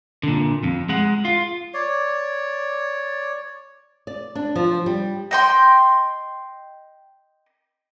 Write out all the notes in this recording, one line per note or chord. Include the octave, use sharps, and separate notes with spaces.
A#2 D3
F2
G#3 F#5
F4
C#5 D5
D5
D4
F3
G3
D#5 G5 C6